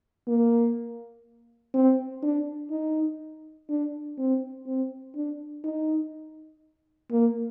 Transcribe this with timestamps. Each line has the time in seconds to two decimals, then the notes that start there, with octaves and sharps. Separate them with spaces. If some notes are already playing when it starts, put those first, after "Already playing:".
0.28 A#3
1.74 C4
2.23 D4
2.71 D#4
3.69 D4
4.18 C4
4.67 C4
5.15 D4
5.64 D#4
7.11 A#3